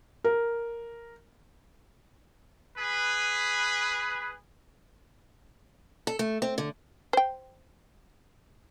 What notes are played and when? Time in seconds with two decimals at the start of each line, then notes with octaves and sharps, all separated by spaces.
0.24 A#4
2.77 G#4 B4
6.07 A4
6.19 A3
6.42 C4
6.58 D3
7.13 C5 G5